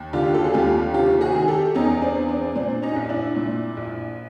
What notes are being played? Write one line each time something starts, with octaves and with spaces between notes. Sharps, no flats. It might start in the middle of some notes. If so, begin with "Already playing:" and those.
Already playing: D#2
D3 F4 G4
A4
G#4
D#2 F4 G4
C3 F4 G4
F#4 G#4
D#3
G4 A4
E2 C#4 D#4
C4 D4
E2
C4 D4
A#2 C4 D4
C#4 D#4
A#1
D4 E4
A#2
A#1